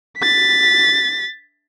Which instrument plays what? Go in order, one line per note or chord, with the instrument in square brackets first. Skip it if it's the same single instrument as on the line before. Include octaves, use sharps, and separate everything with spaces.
[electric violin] A6 B6